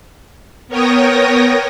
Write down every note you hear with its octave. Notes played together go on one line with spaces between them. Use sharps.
B3 A#4 C#5 G5 D#6 A#6